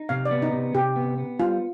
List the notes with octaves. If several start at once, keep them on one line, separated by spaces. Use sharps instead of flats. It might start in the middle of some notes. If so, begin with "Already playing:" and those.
Already playing: D#4
C3 F5
D5
B3
D#4
C3
C3 G4
B3
B3
G3 F4